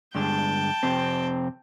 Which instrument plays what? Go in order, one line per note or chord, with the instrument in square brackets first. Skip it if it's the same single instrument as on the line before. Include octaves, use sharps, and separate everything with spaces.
[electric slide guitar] G2 D3 G#3 [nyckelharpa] G5 A5
[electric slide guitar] F2 C3 C4